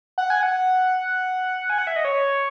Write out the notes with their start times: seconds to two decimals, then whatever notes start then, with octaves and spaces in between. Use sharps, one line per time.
0.18 F#5
0.30 G#5
0.43 F#5
1.70 G#5
1.78 F#5
1.87 E5
1.96 D#5
2.05 C#5